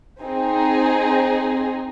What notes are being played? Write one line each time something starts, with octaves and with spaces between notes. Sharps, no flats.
C4 D#4 G#4